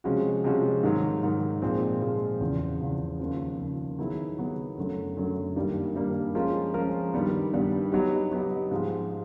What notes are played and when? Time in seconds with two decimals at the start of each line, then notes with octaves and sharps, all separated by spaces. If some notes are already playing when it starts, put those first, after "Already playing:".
0.04 C3 F3 G#3 C#4 F#4
0.44 C3 F3 G#3 C#4 F#4
0.83 G#2 D#3 F#3
1.23 G#2 D#3 F#3
1.62 A#2 F3 G#3 C4
2.01 A#2 F3 G#3 C4
2.41 E2 C#3 F3
2.81 E2 C#3 F3
3.19 D#2 C#3 F3
3.59 D#2 C#3 F3
3.99 D#3 F#3 B3 E4 G#4
4.38 D#3 F#3 B3 E4 G#4
4.78 F#2 D3 F#3 A3
5.17 F#2 D3 F#3 A3
5.56 G2 D#3 G3 A#3
5.95 G2 D#3 G3 A#3
6.35 F3 G#3 C#4 F4 A#4
6.74 F3 G#3 C#4 F4 A#4
7.14 G2 D#3 G3 B3
7.53 G2 D#3 G3 B3
7.92 F#3 B3 D#4 G4
8.32 F#3 B3 D#4 G4
8.71 G#2 F3 G#3